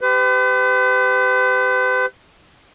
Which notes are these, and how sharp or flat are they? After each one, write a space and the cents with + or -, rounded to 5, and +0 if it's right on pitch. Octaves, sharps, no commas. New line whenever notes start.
G4 +0 B4 +40